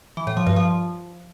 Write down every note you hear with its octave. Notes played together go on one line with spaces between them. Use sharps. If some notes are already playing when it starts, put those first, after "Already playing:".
E3
A2
F3
G2
F3